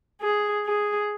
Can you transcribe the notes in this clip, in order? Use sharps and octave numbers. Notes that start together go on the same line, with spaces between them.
G#4
G#4